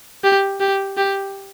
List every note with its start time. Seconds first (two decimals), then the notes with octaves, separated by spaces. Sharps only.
0.24 G4
0.60 G4
0.97 G4